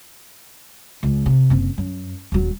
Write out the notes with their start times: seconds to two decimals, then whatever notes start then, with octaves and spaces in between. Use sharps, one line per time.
1.03 C#2
1.26 C3
1.50 F#1 C4
1.78 F#2
2.32 D#1 F#3